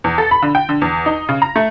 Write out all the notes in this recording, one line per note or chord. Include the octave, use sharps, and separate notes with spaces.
E2
A4
B5
D3
G5
D3
E2
D#4
C#3
A#5
A3